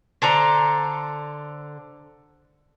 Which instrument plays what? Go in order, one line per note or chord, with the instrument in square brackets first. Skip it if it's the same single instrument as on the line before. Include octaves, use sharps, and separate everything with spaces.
[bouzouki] D3 A4 C5 A#5